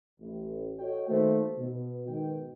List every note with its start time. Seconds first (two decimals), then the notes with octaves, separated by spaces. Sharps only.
0.20 A1
0.79 F#4 A4 C#5 D#5 G5
1.08 D#3 A3 A#3 F#4 C5
1.57 B2
2.08 G#2 B2 D#3 B4 G5